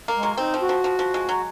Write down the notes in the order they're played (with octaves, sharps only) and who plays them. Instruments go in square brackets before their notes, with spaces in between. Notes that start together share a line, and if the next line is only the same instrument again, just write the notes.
[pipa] A#3
[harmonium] G#3
[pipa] F#3
[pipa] C4 [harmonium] D#4
[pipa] F3
[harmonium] F#4
[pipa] F3
F3
F3
G#3
F#3